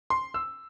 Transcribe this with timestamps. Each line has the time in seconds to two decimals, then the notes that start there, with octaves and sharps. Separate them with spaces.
0.10 C6
0.34 E6